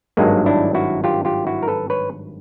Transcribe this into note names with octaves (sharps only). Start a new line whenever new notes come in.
G#1 G2 D#3 F#3 G#3 A#3
D4 E4
E4 F#4
F4 G4
F4 G4
E4 F#4
A#4
A4 B4
B4 C#5